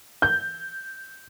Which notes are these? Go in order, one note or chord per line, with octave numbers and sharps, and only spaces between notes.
G6